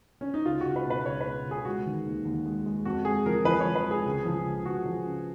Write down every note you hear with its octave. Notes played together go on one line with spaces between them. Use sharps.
C#4
D#4
C#2 F4
C#2 F#4
B4
B2 B4
C#2 C#5
B4
B2
C#2
G#4
G#3 F#4
D#3
D#2
D#2
G#3
G#3
F2 F#4
G#3 G#4
F3 A#4
F3 B4
C#5
F3
B4
G#3
G#4
C#2
F3
C#2
C#2 F#4
F3
C#3